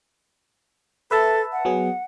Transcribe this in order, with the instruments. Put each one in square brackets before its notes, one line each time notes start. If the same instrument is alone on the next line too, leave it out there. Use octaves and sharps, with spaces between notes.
[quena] A4 [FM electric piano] B4 E5 A5
[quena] F#5
[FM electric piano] F#3 B3 G#4